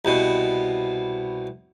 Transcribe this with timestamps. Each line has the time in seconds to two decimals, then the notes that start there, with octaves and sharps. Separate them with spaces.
0.05 C2 B2